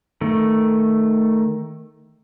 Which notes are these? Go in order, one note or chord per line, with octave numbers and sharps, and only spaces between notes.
D#3 A3